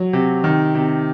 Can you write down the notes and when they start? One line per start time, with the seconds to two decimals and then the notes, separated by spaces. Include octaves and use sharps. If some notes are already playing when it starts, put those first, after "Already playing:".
Already playing: F#3
0.13 C3
0.44 D#3
0.75 C3